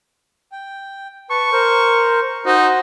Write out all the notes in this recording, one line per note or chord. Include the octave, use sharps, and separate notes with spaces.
G5
B4 A5 C#6
A#4 C5
D#4 F#4 C5